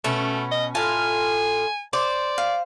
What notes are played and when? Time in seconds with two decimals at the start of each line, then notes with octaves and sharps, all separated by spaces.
0.04 B2 A3 C#4 C#6
0.51 D#5
0.75 A2 F4 G#5 A5
1.93 C5 D5 D6
2.38 F5